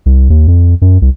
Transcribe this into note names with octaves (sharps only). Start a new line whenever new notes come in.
C2
D#2
F2
F#2
C2